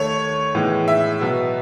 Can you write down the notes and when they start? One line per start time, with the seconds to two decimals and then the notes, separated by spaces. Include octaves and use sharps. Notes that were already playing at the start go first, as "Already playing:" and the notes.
Already playing: D#2 D#3 A3 C#5
0.55 A2 E3 G#3 B3
0.88 E5
1.21 B2 F#3 B3